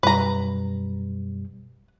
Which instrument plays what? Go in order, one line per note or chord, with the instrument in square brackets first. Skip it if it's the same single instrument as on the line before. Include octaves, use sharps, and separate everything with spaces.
[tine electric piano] F#2 B2 G3 [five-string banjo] B4 A#5